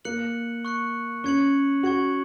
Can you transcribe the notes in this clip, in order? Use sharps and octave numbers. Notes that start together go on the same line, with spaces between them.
A#3 F#6 C#7 F#7
C#6 F#6 C#7
C#4 C#6 G#6 C#7 F#7
F#4 C#6 G#6 C#7 F#7